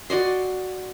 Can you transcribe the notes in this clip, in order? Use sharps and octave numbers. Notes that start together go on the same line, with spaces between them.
F#4 D5 D#5 C6